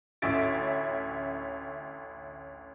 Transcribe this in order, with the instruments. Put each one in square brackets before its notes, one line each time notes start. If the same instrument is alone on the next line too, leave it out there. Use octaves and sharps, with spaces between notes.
[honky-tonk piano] A1 D2 C#4 E5 A6 D7